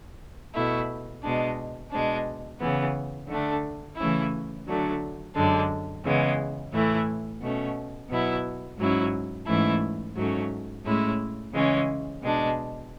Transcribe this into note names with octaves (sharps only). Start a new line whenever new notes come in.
B2 A3 E4
B2 G#3 D4
B2 G#3 D4
C#3 E3 B3
D3 A3 D4
C#3 E3 A3 C#4 E4
D3 F#3 A3 D4
F#2 D3 G#3 D4
C#3 E3 G#3 B3
A2 E3 A3 E4
B2 A3 C#4
B2 F#3 B3 E4
G#2 F#3 C#4 E4
G#2 E3 A3 C#4 E4
G#2 F#3 A3 C#4
A2 G#3 C#4 E4
C#3 E3 G#3 C#4
B2 G#3 D4